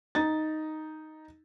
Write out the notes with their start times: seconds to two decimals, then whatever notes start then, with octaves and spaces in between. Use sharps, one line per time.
0.15 D#4 A6